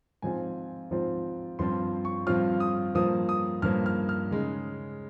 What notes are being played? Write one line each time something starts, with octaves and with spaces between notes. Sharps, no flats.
G#2 F3 C4 F4 G#5
G#2 F3 C4 F4
G2 F3 C4 F4 C6
C#6
G2 F3 C4 F4 F6
D#6
G2 F3 A#3 D#6
D#6
G2 F3 A#3 F6
F6
F6
C#3 G#3 D#4